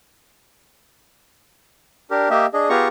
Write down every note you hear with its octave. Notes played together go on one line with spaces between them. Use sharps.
D4 G4 A#4
A#3 G4 D#5 E5
D4 G#4 D#5
B3 F4 G4 G#4 A#5 C#6